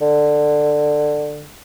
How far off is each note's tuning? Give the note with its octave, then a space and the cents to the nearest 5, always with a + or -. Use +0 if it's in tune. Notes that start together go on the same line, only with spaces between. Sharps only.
D3 +15